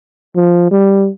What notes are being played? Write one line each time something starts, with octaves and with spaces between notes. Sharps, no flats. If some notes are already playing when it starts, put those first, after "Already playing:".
F3
G3